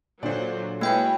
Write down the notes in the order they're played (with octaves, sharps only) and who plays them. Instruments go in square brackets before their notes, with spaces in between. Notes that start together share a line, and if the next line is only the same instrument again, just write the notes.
[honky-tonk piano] A#2 D3 [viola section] F#3 [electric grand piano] C5 D5
[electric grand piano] G#3 E4 [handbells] A#3 G5 G6 [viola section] F#4 B4 C#5